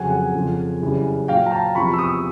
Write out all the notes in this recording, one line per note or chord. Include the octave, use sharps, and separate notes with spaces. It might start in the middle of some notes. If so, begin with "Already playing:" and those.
Already playing: F2 C#3 F#3 F#5 G#5
F#5 G#5
F2 C#3 F3
F#2 C#3 E3 G3
A#2 F#3 F5 G5
A#5
G5 A5
E2 C3 F3 B5 C#6
E6
C#6 D#6